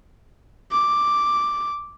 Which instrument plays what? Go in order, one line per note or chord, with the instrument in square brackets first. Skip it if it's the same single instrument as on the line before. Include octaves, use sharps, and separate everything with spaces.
[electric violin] D6